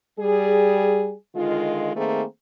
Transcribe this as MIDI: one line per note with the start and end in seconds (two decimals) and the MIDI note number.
0.19 1.14 55
0.19 1.14 68
1.35 1.94 50
1.35 1.94 51
1.35 1.94 56
1.35 1.94 65
1.95 2.23 51
1.95 2.23 57
1.95 2.23 58
1.95 2.23 60
1.95 2.23 68
1.95 2.23 72